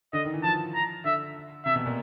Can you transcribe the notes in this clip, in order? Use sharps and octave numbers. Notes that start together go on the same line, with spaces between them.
D3 D#5
D#3
E3
F3 A5
A#5
D3 E5
C3 E5
B2
A#2